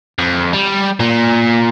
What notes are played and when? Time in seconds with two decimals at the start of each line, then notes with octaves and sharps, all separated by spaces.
0.19 F2
0.53 G3
1.00 A#2